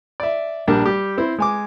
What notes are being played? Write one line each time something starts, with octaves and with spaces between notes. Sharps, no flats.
D5 E5
A#1 G3 D4 A#4 A5
G3 G4
C4 E4 C5
G#3 G#5 D6